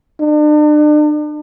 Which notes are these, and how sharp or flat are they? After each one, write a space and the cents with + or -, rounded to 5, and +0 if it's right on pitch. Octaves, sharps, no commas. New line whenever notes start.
D4 +40